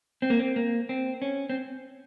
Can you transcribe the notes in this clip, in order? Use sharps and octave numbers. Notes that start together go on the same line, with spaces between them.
C4
A#3
C4
A#3
C4
C#4
C4